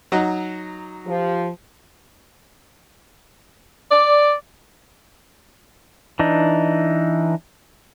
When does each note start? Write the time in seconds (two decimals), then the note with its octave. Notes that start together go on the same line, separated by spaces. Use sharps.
0.12 F#3 D#4 F#4
1.07 F3 G4
3.91 D5
6.19 E3 D4 D#4